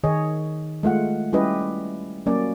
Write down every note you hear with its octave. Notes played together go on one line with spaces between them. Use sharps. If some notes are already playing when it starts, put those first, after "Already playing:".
D#3 G#4 C#5 D#5
G#3 A3 F4 F#5
G3 C#4 E4 G4 B4 D#5
F#3 A#3 C#4 D5